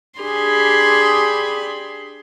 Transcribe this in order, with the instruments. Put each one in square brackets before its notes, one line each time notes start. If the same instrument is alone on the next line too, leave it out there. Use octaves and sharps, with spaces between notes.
[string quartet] D4 G4 G#4 B5 C6